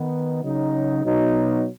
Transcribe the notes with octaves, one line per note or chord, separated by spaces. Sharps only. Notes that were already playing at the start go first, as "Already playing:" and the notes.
Already playing: D#3 B3 D#4
C#3 F#3 D#4
B2 F#3 B3 D#4